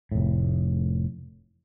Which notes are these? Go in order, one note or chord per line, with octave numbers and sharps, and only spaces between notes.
F1 A2